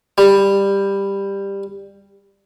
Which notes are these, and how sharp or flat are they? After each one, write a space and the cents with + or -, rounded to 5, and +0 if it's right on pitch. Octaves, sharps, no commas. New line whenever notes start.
G3 +15